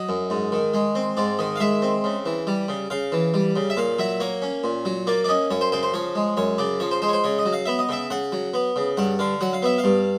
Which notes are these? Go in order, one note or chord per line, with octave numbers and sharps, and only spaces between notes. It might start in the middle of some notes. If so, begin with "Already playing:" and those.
Already playing: F#3 D#5
F#2
G#2
D#3
G#3
C4
G#2 D5
D#3 D#5
F5
G#3 E5
C4
C#3
E3
G3
C#3
C#3 F5
E3
G3
C#3
E5
A#2 F5
F#3 E5
A#3 C#5
C#4
A#2
F#3
A#3 D5
D5
C#4 D#5
F#2 C#5
C5
C#3 C5
C5
F3 C#5
G#3
F#2 C#5
C#3 D5
F3 C#5
C5
G#3 C5
C#5
C5
C#3 C#5
D#5
F#3
F5
B3 E5
D#5
C#3 E5
C#3 F#5
F#3
B3
C#3
G2 F#5
D3 F5
F#3 F#5
F5
B3 E5
F5
G2